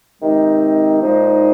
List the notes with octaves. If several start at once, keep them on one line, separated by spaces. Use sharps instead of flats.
C3 D#3 G#3 C4 D#4
A#2 F3 G#3 D#4